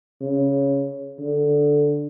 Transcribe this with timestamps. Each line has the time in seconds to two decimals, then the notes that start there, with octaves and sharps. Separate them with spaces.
0.21 C#3
1.20 D3